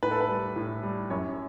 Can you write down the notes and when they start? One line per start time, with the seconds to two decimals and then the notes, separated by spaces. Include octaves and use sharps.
0.03 A2 B4
0.11 A4
0.21 B4
0.29 G3
0.56 A2
0.83 G3
1.10 F#2 C#5